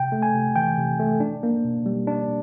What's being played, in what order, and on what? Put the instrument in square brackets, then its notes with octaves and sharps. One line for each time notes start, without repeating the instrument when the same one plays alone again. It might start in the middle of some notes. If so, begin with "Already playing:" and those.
Already playing: [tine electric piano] C3 G5
A3
G#5
C3
E3 G5
C3
A3
D4
A#3
B2
G3
D4